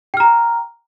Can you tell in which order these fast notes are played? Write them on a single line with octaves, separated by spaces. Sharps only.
G5 F6 A#5